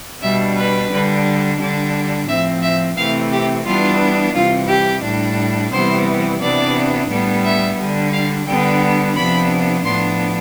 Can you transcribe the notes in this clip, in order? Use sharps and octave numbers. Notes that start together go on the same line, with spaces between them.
B2 G3 D4 E5
B4
D3 G3 D4
D3 G3 D4
A2 F3 C4 E5
E5
C3 E3 A3 C4 F5
G4
E3 G3 B3 D4 F4
C3 E3 G3 F4
G4
A2 G3 D4
C3 E3 G3 B3 C5
C3 E3 B3 D4 D5
A2 G3 B3 D4
E5
D3 G3 D4
F5
D3 G3 B3 D4 G5
C3 F3 B3 D4 B5
A2 F3 B3 D4 C6